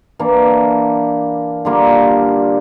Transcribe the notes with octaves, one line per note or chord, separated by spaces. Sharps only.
E3 A#3 D4
D3 G3 A#3 F4